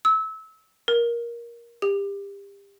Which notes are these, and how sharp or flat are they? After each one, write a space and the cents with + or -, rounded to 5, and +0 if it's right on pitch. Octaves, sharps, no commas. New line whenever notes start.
E6 -25
A#4 +15
G4 +30